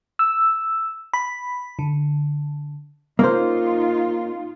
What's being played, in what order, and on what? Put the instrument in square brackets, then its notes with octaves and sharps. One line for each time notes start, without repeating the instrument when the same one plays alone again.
[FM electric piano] E6
B5
D3
[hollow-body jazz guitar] A#3 C#4 C5 [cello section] D#4 F4